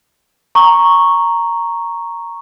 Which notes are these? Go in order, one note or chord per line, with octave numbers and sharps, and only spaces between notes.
A#5 C#6